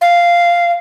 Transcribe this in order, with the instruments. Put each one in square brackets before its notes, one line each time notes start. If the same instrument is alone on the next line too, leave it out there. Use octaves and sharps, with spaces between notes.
[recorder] F5